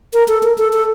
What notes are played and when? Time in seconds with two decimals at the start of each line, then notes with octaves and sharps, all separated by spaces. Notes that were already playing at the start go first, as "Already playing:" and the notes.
0.14 A#4
0.28 A4
0.43 A#4
0.58 A4
0.73 A4